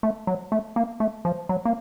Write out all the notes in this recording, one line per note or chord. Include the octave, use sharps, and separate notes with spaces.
A3
F#3
A3
A#3
A3
F3
F#3
A#3